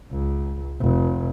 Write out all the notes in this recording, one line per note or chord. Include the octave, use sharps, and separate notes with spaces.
C#2
F1